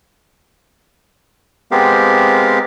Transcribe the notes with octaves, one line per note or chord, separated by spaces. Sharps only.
G#3 B3 C4 G4 A#4 F5